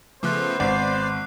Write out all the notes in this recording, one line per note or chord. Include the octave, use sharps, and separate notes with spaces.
C#3 F3 A3 B3 C5 D6 F#6
G#1 D5 C7